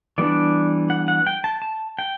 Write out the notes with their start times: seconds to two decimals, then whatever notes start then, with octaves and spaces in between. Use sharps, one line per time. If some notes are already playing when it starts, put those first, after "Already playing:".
0.18 E3 G3 B3 D4 D5
0.90 F#5
1.08 F#5
1.27 G5
1.44 A5
1.62 A5
1.99 G5